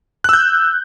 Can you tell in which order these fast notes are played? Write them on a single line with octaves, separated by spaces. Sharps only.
F#6 E6 G6